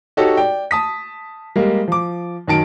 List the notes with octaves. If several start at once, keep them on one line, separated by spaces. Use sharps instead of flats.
D#4 F#4 G4 A4 C#5
D5 G5
A5 D#6 B6
G3 G#3 A#3
F3 D6
F#2 D#3 A5 D7